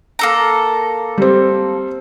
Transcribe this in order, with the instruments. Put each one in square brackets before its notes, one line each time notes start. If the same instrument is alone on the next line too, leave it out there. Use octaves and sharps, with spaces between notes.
[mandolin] A#3 A4 A#5
[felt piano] G3 C4